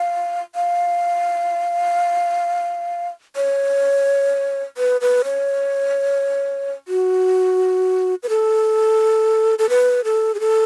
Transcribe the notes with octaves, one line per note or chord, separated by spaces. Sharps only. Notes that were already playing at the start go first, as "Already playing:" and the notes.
Already playing: F5
F5
C#5
B4
B4
C#5
F#4
B4
A4
A4
B4
A4
G#4
A4